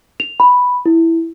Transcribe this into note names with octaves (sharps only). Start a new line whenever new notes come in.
F7
B5
E4